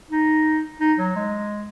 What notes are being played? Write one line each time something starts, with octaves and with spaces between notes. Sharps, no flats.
D#4
D#4
F#3
G#3